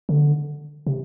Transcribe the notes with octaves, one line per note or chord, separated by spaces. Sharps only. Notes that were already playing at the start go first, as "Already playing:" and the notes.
D3
C3